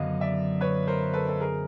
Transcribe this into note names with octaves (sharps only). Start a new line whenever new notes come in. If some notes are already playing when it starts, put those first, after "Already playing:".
Already playing: F#2 D3 F#3 B3 D#5 F5
D5 E5
B4 C#5
A#4 C5
A4 B4
A4
G#4 A#4